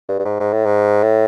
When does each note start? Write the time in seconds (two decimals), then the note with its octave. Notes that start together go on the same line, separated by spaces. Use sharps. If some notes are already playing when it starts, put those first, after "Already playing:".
0.09 G2
0.19 G2
0.25 G#2
0.40 G#2
0.53 A2
0.66 G#2
1.03 A2